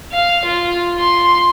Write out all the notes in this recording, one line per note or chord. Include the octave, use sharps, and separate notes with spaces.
F5
F4
C6